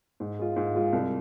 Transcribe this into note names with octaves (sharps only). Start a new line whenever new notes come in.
G#2
G#3 F4
G#2
G#3 F4
C2